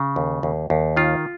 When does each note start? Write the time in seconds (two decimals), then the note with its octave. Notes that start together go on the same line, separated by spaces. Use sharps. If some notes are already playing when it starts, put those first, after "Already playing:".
Already playing: C#3
0.16 D#2
0.43 D#2
0.70 D#2
0.96 D#3 F4